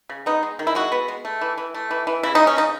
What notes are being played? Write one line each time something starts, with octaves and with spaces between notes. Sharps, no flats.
C#3
B3 D#4
G#3
D#3
E4
G#3 F#4
B3
G#3
A3
E3
E3
A3
E3
E3
C#3 E4
G#3 D#4
C#4
C#3 D#4